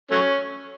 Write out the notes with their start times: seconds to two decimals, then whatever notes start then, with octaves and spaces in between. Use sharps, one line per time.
0.11 F#3 A3 C#4